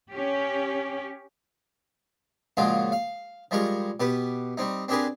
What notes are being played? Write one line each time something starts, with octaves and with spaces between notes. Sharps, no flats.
C#4 G4
A#2 C#3 F3 G#3 F4 F#4
F5
F3 G3 G#3 A#4 C#6
B2 G4 B4
G3 C4 D#4
C4 D4 G4 G#4 A#4 B4